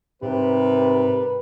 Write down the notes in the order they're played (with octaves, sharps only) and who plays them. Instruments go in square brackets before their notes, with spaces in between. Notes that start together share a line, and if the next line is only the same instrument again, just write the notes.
[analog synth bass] G#2 [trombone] C3 [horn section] G3 A#4 B4